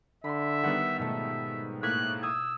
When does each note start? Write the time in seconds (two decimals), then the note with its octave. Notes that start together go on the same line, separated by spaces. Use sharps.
0.24 D3 E5 B5 C6
0.64 D#3 G3 B3 F#5 E6
0.99 G#2 B2 A3 F4 E5
1.83 A2 A#3 F6 F#6 G#6 B6
2.23 D#6 E6 G#6